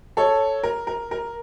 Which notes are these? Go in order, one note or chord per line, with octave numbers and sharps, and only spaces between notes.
A4 C#5
A#4
A#4
A#4